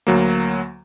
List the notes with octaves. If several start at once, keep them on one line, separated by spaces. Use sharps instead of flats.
D2 F#3 A#3